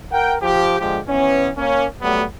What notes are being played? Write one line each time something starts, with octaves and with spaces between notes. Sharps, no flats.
A#4 F#5 G5
F3 G4
D3 F3 G#3 G4
E3 B3 C#4
A#3 C#4
F#3 G3 A3 B3